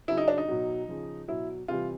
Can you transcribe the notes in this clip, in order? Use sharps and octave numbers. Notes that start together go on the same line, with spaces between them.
C#3 F#3 E4
D#4
D4
D#4
B2 F#3
C#3 F3
B2 F#3 E4
C3 E3 G3 F4